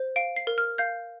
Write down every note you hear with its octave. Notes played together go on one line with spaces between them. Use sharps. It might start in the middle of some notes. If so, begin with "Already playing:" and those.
Already playing: C5
F5 D7
C7
A#4
F6
F5 G6